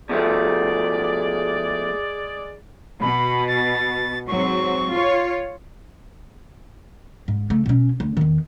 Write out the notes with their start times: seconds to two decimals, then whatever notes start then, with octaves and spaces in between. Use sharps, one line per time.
0.09 B2 F3 G#3 A3 G#4 D5
3.01 B2 B5
3.47 A6
4.27 G#2 F#3 C4 C#6
4.91 F4 C#5
7.28 G#2
7.50 C#3 A3
7.66 B2 C#4
8.00 D2
8.17 E2 D#3